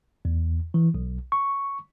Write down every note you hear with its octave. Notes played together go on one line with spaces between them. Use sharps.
E2
E3
B1
C#6